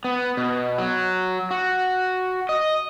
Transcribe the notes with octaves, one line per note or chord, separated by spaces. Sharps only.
B3
B2
F#3
F#4
D#5